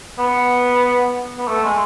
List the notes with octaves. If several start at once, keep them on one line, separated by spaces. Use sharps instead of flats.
B3
B3
A3
G#3